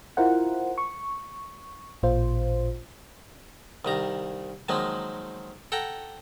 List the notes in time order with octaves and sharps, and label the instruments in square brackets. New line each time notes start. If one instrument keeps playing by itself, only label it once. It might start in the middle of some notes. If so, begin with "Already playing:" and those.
[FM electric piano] E4 F4 A#4 C5 F#5
C#6
A1 A#2 F4 C5
[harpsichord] C2 D#3 A#5
D#3 F3 F#3 G#3 A#3
A4 F#5 G5 A#5